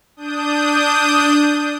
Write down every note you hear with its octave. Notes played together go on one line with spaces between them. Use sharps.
D4 D#6 G6